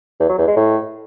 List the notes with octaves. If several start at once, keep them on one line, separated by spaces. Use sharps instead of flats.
E2
F#3
E2
G#3
A2